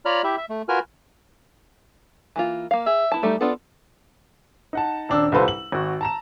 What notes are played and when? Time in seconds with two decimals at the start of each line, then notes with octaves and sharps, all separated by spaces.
0.05 F4 C#5 D5 A#5 B5 F6
0.24 E4 G4 E5
0.37 E5
0.49 A3
0.69 F4 F#4 A#4 B4 G#5 F6
2.36 E3 A#3 F4
2.71 A#3 F5
2.87 G#4 E5
3.12 B3 E4 A5
3.23 G3 A3 D#4
3.41 B3 D4 F4 A4
4.73 D#4 F#5 A5
5.09 D#1 D4 E6
5.32 C2 G3 F4 A4 B4 C5
5.48 F#7
5.72 G#1 F#4
6.01 A5 A#5 E7